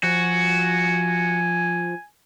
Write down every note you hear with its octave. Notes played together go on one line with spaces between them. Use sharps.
F3 F#4 G#5